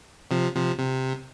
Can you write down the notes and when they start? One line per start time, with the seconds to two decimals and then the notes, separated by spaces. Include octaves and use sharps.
0.31 C3 F3
0.55 C3 F3
0.79 C3